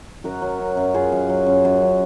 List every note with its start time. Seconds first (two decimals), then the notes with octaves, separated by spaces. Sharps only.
0.24 F#2 F#4 A#4
0.42 F#3
0.59 F#2
0.77 F#2
0.94 F#2 F4 G#4
1.12 F#2
1.29 F#3
1.47 F#2
1.65 F#2
1.82 F#3